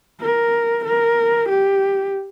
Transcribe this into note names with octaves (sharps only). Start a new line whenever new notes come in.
A#4
A#4
G4